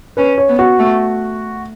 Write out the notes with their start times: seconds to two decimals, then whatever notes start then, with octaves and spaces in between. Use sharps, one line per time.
0.17 C#4 B4
0.38 C#5
0.48 B3
0.59 F#4
0.79 A3